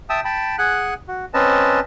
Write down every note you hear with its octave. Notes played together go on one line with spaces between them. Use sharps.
E5 G5 A5 D#6 E6
G5 A5 B5
G#4 F#5 G#5 F#6
F#4
C4 C#4 B4 D#5 A5